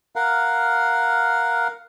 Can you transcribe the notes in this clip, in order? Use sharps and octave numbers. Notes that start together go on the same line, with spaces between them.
A#4 F5 F#5